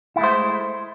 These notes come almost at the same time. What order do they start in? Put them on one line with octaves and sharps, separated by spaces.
E4 A3 G#3 C5